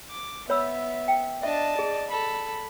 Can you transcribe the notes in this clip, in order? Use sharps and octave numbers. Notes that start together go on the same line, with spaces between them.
D6
B3 C#5 E5 B5 E6
G5
D4 D#5 E5 A5
G#4 D5
A4 B5